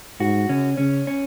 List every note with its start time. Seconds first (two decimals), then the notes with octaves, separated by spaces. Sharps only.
0.20 G#2 F#4
0.49 C#3 C#4
0.77 C#3 C#4
1.07 C#4